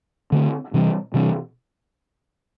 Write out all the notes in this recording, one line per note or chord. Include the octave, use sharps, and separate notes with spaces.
D3 A3 C4
C3 E3 G3 C4
C3 E3 G3 C4